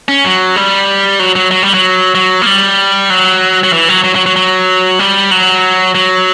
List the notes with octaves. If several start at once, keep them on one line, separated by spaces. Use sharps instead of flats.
C#4
F#3
G3
F#3
F#3
F#3
G3
F#3
F#3
A#3
G3
F#3
F#3
E3
F#3
F#3
F#3
F#3
F#3
G3
F#3
F#3